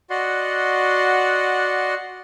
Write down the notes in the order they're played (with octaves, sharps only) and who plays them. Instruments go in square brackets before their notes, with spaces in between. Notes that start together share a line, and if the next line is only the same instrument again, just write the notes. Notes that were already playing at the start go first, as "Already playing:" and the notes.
[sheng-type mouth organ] F#4 D5 D#5 F#5 C6